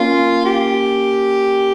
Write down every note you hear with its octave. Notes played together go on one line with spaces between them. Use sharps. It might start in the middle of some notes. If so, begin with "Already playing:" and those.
Already playing: A#3 C#4 F4
G4